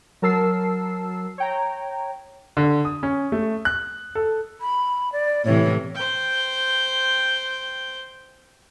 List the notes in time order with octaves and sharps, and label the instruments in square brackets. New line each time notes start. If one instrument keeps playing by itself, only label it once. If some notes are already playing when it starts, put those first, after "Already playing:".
[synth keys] F#3 A#4 A5 E6 C7
C#5 G5 A#5
[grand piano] D3
D#6
C#4
A3
F#6
A4
[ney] B5
D5
[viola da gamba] A2 C3 E3 [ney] C#5
[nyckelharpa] C5 G5